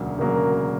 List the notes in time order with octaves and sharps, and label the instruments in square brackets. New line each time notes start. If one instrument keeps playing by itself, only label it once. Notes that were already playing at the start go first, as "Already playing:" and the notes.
Already playing: [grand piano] E1 D2 C#3 F#3 A#3
[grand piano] E1 D2 C#3 F#3 A#3 [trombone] A#4